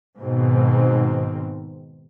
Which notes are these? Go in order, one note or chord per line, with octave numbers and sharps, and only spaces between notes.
G#2 B2 D#3 C4